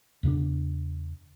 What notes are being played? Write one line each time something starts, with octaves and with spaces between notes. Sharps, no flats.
E2 C#3 A3 D4